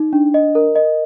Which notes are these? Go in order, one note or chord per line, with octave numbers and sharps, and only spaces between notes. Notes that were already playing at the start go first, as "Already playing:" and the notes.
Already playing: D#4
D4
D#5
A#4
D#5